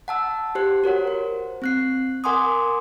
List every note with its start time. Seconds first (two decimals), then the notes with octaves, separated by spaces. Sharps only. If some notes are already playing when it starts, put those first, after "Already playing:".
0.08 F#5 A5 E6
0.55 G4 C5 F#6
0.84 F#4 A#4 C#5 F#5
1.07 C5
1.62 C4 F#6 C7
2.24 A#4 F#5 G#5 C6 D6 D#6